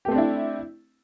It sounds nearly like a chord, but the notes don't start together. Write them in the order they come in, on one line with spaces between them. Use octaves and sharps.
G4 A3 C4 D4 E4